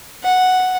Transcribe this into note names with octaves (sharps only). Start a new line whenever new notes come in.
F#5